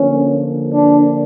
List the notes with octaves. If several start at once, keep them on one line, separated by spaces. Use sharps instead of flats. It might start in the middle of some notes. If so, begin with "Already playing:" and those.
Already playing: D3 F3 A#3 C#4
D4